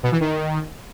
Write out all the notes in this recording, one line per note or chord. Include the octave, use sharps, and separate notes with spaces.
B2
E3
D#3